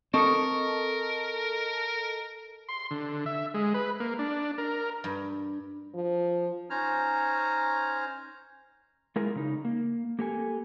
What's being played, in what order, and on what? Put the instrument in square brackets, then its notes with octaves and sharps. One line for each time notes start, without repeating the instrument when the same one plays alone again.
[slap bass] C4 [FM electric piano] A4 D#5 A5 [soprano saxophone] A#4 [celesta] C#6 D#6 C#7
[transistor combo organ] C6
D3
E5
G#3
B4
A#3
D4
A#4
[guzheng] G2
[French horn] F3
[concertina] C#4 D#4 C5 C#5 A#5 F6
[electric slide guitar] G#3 E4 F4 G#4 A#4
C#3 D#4
A#3
A#3 G4 A4 G#5